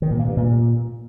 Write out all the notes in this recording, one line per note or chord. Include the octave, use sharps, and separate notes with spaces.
D#3
A#2
A#3
G2
A#2